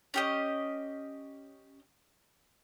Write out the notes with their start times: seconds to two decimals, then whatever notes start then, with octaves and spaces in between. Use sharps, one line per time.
0.14 C#4 G4 D#5